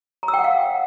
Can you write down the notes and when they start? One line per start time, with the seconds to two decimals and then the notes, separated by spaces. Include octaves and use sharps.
0.23 A#5
0.28 E6
0.34 G5
0.39 F#5
0.44 F5